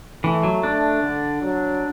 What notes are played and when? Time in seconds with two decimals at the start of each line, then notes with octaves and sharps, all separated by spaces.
0.24 E3 A3
0.43 F#3
0.63 A3 D4
1.03 D3
1.42 F#3